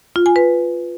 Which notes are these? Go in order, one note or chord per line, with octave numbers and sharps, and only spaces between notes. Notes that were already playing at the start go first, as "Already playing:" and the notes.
F4
G#5
B4